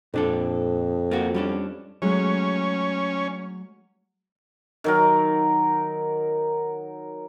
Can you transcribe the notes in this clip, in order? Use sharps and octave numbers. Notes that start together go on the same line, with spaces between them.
F2 A#2 D4 A4
A#3 F4 F#4
G3 C#4 D4
F#3 G#3 A3 C#4
D#3 F#3 A#4